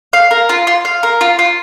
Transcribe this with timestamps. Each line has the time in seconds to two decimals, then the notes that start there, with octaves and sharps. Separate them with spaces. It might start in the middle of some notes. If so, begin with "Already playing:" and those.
0.13 F5
0.31 A#4
0.49 F4
0.67 F4
0.85 F5
1.03 A#4
1.21 F4
1.39 F4